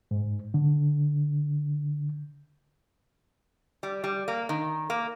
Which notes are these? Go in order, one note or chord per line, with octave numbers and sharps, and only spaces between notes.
G#2
D3
G3
G3
A#3
D#3
A#3